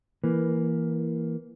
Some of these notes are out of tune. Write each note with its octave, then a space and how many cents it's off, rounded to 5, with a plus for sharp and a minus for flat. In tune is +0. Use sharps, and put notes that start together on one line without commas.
E3 +5 A#3 +0 B4 -10